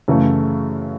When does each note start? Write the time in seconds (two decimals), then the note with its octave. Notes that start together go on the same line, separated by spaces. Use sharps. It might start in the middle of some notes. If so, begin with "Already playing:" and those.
0.08 F#2 C#3 E3 A3